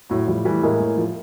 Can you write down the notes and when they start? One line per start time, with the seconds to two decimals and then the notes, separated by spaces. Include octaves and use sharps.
0.09 A2 F#3
0.27 A2 F3 G3
0.45 E3 G3 A3
0.63 A2 G#3 A#3
0.80 A2
0.97 F3